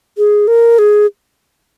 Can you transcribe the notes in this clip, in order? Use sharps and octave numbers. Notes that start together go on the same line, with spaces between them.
G#4
A#4
G#4